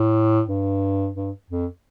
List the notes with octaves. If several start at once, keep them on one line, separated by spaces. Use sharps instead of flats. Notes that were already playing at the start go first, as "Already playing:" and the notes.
Already playing: A2
G2
G2
F2